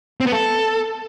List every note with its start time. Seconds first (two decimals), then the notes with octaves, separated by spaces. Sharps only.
0.21 C4
0.26 B3
0.32 A4